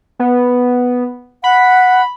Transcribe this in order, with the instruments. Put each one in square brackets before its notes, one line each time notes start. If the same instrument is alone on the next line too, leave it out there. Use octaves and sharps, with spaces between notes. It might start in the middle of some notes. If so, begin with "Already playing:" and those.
[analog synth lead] B3
[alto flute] F#5 [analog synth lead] B5